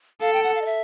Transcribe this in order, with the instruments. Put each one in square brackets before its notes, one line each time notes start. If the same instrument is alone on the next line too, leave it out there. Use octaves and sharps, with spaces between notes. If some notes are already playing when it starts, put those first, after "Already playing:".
[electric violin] A4 [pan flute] F5
[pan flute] G5
F#5
F5
D#5
E5